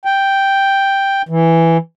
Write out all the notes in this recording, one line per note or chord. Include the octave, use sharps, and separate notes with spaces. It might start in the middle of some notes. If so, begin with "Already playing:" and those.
G5
E3